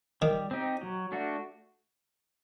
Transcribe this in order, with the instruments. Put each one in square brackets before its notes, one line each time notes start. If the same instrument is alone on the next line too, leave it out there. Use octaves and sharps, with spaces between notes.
[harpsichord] D#3 [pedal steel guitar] G3
[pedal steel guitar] C4 D#4 G4
F#3
A3 D4 F#4